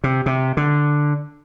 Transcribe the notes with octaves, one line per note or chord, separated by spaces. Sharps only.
C3
C3
D3